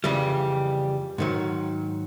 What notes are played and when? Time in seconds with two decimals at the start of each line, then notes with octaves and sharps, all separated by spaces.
0.04 F2 C#3 E3 G3
1.18 G#2 D#3 F#3